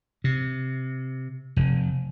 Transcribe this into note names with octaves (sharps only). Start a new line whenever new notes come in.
C3
F1